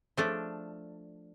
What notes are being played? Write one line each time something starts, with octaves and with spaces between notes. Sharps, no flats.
F3 A3 D4